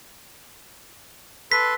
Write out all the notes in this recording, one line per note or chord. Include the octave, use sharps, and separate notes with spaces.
A4 B4 C6 B6